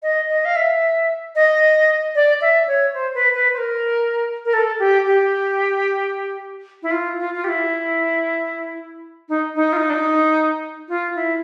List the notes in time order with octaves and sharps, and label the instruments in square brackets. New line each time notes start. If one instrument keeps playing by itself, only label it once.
[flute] D#5
D#5
F5
E5
D#5
D5
E5
C#5
C5
B4
B4
C5
A#4
A#4
A4
G4
G4
E4
F4
F4
F4
G4
E4
D#4
D#4
F4
D#4
D4
D#4
F4
E4